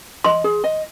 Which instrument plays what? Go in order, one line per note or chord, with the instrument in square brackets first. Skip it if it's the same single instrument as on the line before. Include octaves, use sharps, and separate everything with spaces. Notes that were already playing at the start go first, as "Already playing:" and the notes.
[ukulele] D#5 [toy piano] C6
[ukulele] G#4
D#5